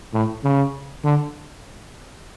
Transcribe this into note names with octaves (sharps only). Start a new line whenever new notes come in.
A2
C#3
D3